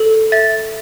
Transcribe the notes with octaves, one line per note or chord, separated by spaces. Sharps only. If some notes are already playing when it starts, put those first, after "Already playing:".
Already playing: A4
E5 A6